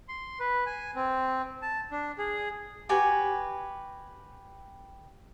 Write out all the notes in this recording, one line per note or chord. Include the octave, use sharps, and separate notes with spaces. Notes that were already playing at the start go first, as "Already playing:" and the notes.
C6
B4
G#5
C4
A5
D4
G#4
F#4 G4 B4 G#5